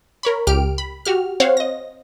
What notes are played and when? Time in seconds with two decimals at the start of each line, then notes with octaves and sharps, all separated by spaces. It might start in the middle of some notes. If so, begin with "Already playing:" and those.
0.23 A#4 C#5 B5
0.47 C#2 G4 F6 D7
0.78 B5
1.05 F#4 G4 F6
1.40 C4 C5 C#5 F5 F#5
1.57 D#5 A#6